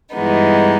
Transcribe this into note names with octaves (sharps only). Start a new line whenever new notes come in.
G2 E3 G#3 B3 D#4